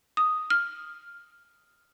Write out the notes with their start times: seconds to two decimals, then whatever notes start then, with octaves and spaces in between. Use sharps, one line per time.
0.17 D#6
0.50 F6